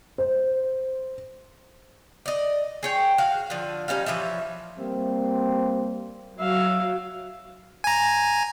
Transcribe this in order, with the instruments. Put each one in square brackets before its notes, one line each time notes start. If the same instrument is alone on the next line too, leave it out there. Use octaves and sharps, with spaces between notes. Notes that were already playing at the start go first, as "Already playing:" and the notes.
[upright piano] C5
[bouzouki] D5 D#5
G#4 C#5 G5
F#4 F5
D3 F3
G3 C#4 D#4 F5
E3 F3 C#5 E5
[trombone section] G3 A#3 C4
[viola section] F#3 [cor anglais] E5 [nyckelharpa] F5
[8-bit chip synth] G#5 A#5